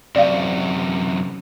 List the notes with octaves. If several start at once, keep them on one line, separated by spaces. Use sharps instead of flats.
F#2 C3 D5 F5